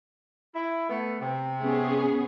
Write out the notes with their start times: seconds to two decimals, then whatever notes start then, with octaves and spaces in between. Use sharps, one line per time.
0.54 E4
0.90 A3 B3
1.20 C3
1.61 B3 C#4 G#4